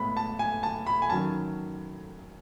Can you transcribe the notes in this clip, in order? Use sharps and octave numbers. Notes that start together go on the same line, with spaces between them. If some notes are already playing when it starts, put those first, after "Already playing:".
Already playing: A2 G#3 B3 B5
A5
G#5
A5
B5
G#5
D#3 F#3 C#4 A5